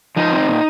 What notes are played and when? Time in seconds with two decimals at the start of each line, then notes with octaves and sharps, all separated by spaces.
0.16 F3 D#4
0.32 C4
0.48 A#2